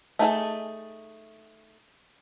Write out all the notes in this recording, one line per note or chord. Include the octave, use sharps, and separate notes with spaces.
A3 D#4 G#4 A5